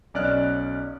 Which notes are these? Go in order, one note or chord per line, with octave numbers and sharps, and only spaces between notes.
B1 C#4 D5 D#5 F6 F#6